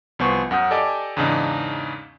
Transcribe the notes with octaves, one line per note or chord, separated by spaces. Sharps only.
C2 F3 B3 C5 G#5 C#6
F#2 F#5 D#6 G6
G4 A4 D5 D#5 G#5 D6
E2 G#2 C#3 D4 D#4